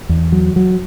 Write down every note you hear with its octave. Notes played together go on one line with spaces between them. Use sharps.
E2
F#3
F#3